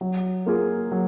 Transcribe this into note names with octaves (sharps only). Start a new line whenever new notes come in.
F#3
A#3 F4 G#4
F#3